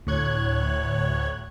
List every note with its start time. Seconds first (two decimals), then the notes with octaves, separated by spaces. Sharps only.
0.07 D2 A2 C#5 F#6 G#6